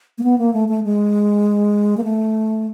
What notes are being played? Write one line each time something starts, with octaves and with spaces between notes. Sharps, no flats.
A#3
B3
A#3
A3
A3
G#3
A#3
A3